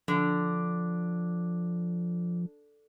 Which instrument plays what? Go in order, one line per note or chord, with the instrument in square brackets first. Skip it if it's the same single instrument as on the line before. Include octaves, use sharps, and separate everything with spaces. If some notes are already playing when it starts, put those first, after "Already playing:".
[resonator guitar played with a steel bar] D3 [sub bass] F3